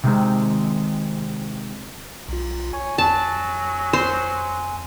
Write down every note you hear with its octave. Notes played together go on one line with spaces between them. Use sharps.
C3 D#3 G#3 C4
B1 F4
C#5 G#5
F2 F#3 A5
C5 C6